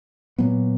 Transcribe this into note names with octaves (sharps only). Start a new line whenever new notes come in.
A#2 F#3 B3